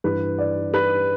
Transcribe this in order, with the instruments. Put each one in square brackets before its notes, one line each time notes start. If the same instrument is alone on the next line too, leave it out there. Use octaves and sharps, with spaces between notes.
[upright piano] G2 E3 G3 B4
D5
B4